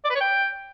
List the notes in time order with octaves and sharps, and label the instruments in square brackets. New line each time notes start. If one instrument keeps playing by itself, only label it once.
[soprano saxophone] D5
B4
C#5
G5